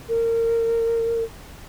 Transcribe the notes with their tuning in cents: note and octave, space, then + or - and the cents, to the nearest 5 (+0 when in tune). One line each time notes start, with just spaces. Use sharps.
A#4 -25